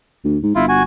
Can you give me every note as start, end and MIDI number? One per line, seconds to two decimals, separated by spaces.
0.24 0.38 38
0.43 0.55 44
0.55 0.82 31
0.55 0.65 64
0.55 0.65 65
0.69 0.83 66
0.69 0.83 80